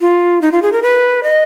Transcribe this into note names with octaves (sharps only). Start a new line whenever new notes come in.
F4
D#4
F4
G#4
A#4
B4
D#5